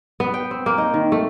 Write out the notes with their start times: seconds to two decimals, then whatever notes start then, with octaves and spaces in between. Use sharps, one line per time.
0.20 B3
0.34 G5
0.51 C4
0.66 A#3
0.78 D#4
0.94 D#3
1.12 A3